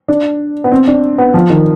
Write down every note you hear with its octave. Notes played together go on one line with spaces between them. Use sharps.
D4
B3
C4
D4
B3
F3
D#3